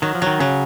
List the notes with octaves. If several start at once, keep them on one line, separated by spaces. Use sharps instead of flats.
D#3 F#3
F3
D#3 F#3
C#3 F#3